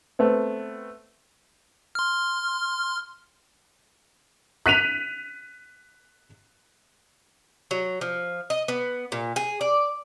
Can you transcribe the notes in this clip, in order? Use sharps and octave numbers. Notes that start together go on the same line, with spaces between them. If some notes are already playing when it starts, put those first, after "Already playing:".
A3 B3 C4
C6 F6
F#6 B6 D#7 F7
F#3
F3
D#5
B3
A#2
G#4
D5